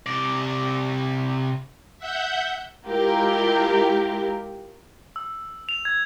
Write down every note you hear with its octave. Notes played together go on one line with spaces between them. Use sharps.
C3 D5
E5 F#5 G6
G#3 E4 F4 G4 A#4
E6
F7
G#6